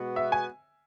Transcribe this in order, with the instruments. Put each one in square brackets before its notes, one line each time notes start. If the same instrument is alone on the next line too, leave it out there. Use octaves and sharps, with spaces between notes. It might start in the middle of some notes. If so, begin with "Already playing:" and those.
Already playing: [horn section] B2 G#3 B3 F#4
[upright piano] E5
G#5